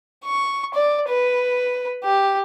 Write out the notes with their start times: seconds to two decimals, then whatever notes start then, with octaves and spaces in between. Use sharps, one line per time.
0.25 C#6
0.74 D5
1.09 B4
2.04 G4